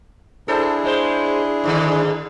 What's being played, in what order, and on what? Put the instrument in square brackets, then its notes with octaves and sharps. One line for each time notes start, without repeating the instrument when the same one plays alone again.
[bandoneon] D4 E4 G#4 [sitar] A4 C5
[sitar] G#3 C5
G#2 D3 D#3